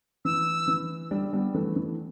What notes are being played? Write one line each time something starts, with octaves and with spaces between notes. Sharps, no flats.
E3 E6
E3
D3 G3
G3 B3
E3 A3
E3